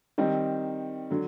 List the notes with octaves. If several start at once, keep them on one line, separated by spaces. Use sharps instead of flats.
D#3 G3 C4 D#4
D3 F#3